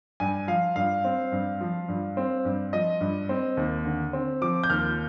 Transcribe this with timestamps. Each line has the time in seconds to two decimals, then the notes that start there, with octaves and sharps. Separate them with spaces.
0.20 G2 G#5
0.48 F3 F5
0.76 G2 F5
1.04 C4
1.32 G2
1.61 F3
1.88 G2
2.17 C4
2.45 G2
2.73 F3 D#5
3.01 G2
3.29 C4
3.57 D#2
3.85 D3
4.13 C4
4.41 F3 D6
4.64 G6
4.70 D#2 F6